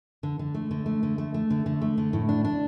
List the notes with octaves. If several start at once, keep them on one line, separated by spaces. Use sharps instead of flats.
D3
D3
A3
D3
A3
D3
A3
A3
D3
D3
A3
D3
A2
D4
D4